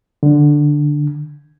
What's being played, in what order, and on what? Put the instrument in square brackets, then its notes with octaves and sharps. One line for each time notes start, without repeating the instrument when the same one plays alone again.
[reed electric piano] D3